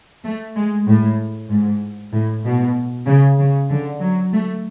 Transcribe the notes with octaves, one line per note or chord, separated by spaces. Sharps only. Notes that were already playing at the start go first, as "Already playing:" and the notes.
A3
G#3
A2
G#2
A2
B2
C#3
C#3
D3
F#3
A3